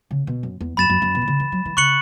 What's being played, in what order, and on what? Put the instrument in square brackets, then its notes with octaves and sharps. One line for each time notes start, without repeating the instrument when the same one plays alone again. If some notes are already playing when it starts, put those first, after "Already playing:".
[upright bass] C#3
B2
F#2
E2
[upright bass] F#2 [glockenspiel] B5 A6 E7
[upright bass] F#2
F#2
B2
E3
C#3
E3
F#3
E3
[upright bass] C#3 [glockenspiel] C#6 F#6 C#7 F#7